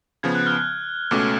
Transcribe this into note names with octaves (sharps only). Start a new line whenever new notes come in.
C#3 F3 B3 G#6
F#6
F6
F#6
C#2 B2 A3 C#4 D6